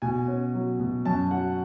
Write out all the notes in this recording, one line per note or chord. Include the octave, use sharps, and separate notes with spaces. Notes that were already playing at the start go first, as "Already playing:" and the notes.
B2 G#5
C#4
F#3
B2
F#2 A5
F#3 F#5